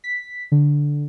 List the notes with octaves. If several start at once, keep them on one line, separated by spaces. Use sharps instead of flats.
B6
D3